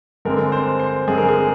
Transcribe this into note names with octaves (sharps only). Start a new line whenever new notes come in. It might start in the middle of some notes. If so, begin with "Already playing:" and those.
G2 D3 G#3 C4 A#4
C5
C5
G2 D3 G#3 C4 G#4
A#4
G#4